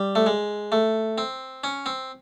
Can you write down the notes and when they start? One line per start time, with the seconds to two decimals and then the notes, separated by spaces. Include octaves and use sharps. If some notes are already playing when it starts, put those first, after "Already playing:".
Already playing: G3
0.15 A3
0.26 G#3
0.72 A3
1.18 C4
1.64 C#4
1.86 C4